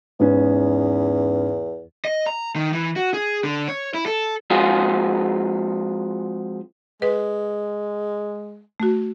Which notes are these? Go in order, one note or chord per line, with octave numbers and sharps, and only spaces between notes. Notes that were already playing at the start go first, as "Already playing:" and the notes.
E2 G#2 B3 C#4
D#5
A#5
D#3
E3
F#4
G#4
D3
C#5
E4
A4
F3 G#3 C4 F4 F#4 G#4
G#3 B4
A3 F#4